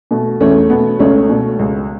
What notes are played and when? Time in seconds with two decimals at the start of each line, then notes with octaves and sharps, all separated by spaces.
0.11 B2 A3
0.40 E2 A3 C#4
0.70 B2 A3 B3
0.99 C#2 A3 C#4
1.29 B2 A3
1.59 C#2